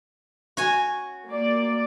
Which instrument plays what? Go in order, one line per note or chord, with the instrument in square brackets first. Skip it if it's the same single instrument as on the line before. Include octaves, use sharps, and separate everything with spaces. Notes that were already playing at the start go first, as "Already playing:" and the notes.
[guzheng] F#4 C#5 G#5
[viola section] A#3 D5